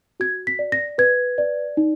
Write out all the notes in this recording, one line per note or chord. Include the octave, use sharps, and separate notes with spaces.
F#4 G#6
B6
D5
A#6
B4 G#6
D5
D#4